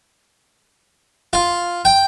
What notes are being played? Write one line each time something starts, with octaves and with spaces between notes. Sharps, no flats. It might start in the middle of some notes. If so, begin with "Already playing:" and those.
F4
G5